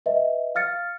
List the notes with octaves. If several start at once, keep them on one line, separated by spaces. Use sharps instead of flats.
B4 D#5 E5
F5 F6 A6 C#7